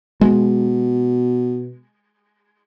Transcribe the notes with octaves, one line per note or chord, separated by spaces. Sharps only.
B2 G#3